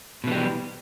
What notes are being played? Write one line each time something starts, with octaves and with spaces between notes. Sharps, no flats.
B2 E3 G3